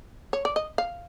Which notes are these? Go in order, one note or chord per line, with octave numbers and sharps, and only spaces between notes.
C#5
D5
D#5
F5